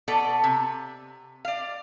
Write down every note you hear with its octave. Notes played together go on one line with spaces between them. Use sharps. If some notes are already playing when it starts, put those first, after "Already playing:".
B2 B3 A4 D5
C3
D5 F5